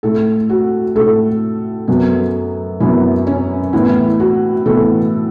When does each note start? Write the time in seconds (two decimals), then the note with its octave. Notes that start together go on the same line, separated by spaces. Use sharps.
0.03 A2 A3 A4
0.50 F#4
0.96 A2 A3 A4
1.88 F#2 F#3 B3
2.80 F#2 F#3 B3 E4
3.27 C#4
3.73 A2 E3 B3 E4
4.20 F#4
4.66 A2 E3 B3 A4